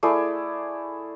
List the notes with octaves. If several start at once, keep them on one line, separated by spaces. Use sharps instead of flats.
A3 E4 G#4 D5